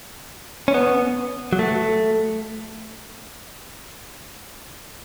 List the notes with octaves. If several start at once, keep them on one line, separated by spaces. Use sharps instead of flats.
C#4
B3
F#3
A3